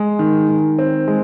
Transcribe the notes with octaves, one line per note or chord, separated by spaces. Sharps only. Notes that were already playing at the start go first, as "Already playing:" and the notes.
Already playing: G#3
D#3
D#3
C4
G#3